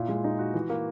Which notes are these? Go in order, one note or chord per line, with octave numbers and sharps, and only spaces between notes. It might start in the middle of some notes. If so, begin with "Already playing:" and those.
Already playing: A#2 E4
G#3
D#4
F#4
E3
A#3